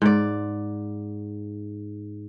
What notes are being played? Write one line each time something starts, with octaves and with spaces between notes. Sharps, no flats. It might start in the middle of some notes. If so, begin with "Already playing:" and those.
G#2 D5